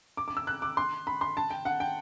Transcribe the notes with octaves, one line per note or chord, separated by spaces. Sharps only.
D6
D6
E6
F#6
D6
C6
B5
C6
A5
G5
F#5
G5